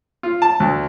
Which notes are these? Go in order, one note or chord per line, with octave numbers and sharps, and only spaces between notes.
F4
A5
D2